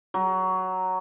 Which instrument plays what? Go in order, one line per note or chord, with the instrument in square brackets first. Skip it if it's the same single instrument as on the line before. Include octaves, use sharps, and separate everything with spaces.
[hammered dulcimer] F#3